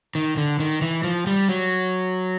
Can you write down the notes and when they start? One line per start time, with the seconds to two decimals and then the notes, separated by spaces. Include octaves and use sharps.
0.15 D#3
0.37 D3
0.59 D#3
0.82 E3
1.04 F3
1.27 G3
1.49 F#3